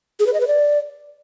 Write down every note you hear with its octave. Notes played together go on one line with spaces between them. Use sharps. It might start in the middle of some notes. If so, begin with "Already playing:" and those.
G#4
B4
D#5
B4
D5